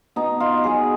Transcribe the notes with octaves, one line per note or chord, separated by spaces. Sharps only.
B2 D#4
F4
F#3 B3 G#4